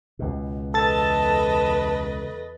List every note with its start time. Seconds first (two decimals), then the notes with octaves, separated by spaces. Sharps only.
0.19 C#2 B2
0.74 E2 A4 B4 D#5 A5 A6